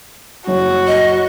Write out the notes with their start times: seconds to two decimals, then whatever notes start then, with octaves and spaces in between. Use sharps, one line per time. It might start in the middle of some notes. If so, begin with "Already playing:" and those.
0.47 F#1 F#4 C#5
0.87 D#5